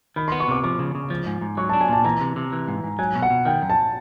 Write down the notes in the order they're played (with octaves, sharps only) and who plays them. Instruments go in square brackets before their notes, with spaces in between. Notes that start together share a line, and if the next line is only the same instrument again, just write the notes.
[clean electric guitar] D#3 [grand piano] B5
[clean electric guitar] B3 [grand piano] C6
[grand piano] C#6
[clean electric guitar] C3 [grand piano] D6
[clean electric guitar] F3 [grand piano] D6
[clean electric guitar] C#3
C#3
F3
G#2
G#2
[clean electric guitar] F#3 [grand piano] C#6
[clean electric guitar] D4 [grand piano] A5
[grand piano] G#5
[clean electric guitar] A#2 [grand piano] A5
[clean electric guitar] E3 [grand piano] A#5
[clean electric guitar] C3
C3
E3
G#2
G#2
[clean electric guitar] F#3 [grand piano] G#5
[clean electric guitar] B2
[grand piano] F#5
[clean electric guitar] B2
[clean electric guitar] D#3 [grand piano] G5
[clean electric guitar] F#2
[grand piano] A5